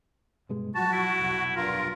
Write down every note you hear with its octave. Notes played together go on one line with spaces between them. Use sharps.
G2 B2 G#3
F3 F#3 F#4 A5
E4
F1 B1
G2 F4 A#4